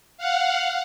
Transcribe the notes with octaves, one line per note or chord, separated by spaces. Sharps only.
F5 F#5